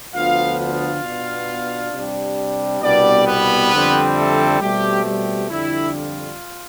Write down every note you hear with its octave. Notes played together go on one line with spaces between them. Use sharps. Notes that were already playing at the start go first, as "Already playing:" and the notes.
D2 D3 F3 B3 F4 F5
F4 F5
B2 B3 D4
C3 G3 D4
C2 B2 G3 B3 D4 D5
B3 B4
F2 D3 G3 C4
A3 A4
B2 G3 A3 C4 G4
G3 G4
F2 D3 G3 D4 E4
F4